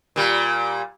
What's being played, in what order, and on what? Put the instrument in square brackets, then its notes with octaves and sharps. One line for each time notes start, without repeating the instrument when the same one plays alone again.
[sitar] A#2 G3